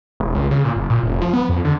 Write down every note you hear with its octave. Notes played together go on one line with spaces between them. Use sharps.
E1
C#2
C#3
A#2
F#1
A#2
F1
F3
B3
F2
D3